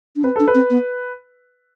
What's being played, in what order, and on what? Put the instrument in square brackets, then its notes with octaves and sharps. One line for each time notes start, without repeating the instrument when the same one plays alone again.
[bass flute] D4
[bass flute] C4 [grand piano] B4
[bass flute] D4 [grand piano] A4
[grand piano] B4
[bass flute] C4
B3